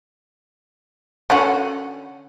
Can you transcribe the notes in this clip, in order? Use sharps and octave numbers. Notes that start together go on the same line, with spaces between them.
D3 C#4 F#4